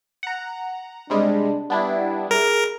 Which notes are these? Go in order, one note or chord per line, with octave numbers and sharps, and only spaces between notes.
F#5 A#5
C3 G3 G#3 D4
G3 B3 D4 E4
G#4 A#4